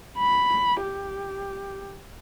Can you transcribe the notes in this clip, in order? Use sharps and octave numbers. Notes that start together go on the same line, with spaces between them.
B5
G4